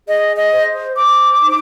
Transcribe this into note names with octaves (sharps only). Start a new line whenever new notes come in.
G#4 D#5
D#5
C5
C5 D6
D#4